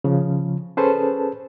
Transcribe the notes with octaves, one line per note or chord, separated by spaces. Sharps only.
C#3 F3
C#4 G#4 A4 B4 C5 A5